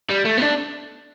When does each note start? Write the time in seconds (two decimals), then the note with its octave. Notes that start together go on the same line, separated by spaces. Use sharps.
0.10 G3
0.25 A3
0.38 B3
0.42 D4